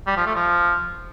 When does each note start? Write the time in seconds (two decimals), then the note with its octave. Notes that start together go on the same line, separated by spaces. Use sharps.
0.07 G3
0.16 F3
0.26 A3
0.35 F3